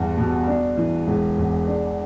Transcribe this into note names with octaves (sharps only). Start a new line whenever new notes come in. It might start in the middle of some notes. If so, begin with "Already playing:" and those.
Already playing: E2 G2
B2
D4
E3
E1
E2
D4